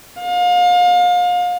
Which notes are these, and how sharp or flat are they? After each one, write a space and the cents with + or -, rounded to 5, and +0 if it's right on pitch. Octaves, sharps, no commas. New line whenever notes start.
F5 +35